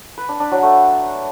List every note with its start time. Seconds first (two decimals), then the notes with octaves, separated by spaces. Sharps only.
0.18 B4
0.29 D4
0.40 D4
0.51 F#3
0.63 A3